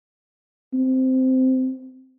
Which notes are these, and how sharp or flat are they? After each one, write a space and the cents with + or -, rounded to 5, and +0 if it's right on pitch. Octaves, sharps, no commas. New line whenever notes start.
C4 -10